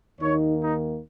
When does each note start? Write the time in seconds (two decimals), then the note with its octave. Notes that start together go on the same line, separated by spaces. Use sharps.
0.20 D#2 D#3 A#3 D#4 C#5
0.60 D#4